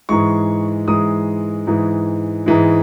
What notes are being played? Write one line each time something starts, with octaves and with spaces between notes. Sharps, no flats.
G#2 E3 G#3 C#6
G#2 E3 G#3 D#6
G#2 E3 G#3
G#2 E3 G#3